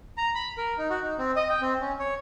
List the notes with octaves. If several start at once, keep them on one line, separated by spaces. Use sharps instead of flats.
A#5
B5
A#4
D#4
F#4
D#4
C4
D#5
G5
C4
C#4
C#5